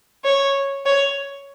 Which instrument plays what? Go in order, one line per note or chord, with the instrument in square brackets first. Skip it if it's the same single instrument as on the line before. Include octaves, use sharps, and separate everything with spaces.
[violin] C#5
C#5